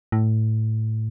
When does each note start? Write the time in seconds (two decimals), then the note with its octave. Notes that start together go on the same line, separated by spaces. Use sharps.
0.12 A2